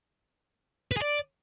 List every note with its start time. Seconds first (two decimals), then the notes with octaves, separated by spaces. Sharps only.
0.91 B4
0.97 G#4
1.02 D5